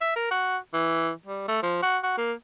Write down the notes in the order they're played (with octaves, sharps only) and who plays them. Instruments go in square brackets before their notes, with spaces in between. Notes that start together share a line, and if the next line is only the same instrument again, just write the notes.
[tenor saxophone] E5
A#4
F#4
E3
G3
A3
F3
F#4
F#4
A#3